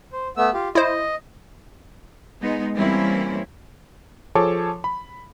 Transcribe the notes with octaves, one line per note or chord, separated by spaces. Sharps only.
C5
A3 B3 E6
F4 G4
E4 C5 D#5
G#3 B3 D#4
E3 G3 A#3 C4 C#4 E4
F3 G#4 A4 C#5 A5 D6
B5